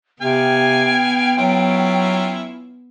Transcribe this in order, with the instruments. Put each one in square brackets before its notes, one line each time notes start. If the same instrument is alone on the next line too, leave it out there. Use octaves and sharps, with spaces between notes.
[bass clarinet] C3 [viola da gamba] B3 [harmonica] F5 G#5 [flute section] G5
[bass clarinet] F#3 [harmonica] C#4 E4 F4